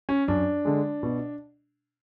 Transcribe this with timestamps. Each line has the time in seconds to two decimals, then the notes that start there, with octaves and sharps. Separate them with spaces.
0.09 C#4
0.28 F#2 D4
0.65 D3 G#3
1.03 B2